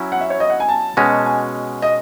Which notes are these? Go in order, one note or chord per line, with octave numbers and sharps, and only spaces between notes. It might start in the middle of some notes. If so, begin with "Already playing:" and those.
Already playing: F#3 C#4 E4
F#5
E5
C#5
D#5
F#5
G#5
A5
B2 G#3 C#4 F#4
G#5
D#5